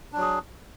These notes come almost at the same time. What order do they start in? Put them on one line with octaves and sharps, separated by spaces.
D4 F#3 G#4